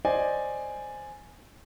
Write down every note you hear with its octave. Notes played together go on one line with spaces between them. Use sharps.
C5 D5 D#5 G#5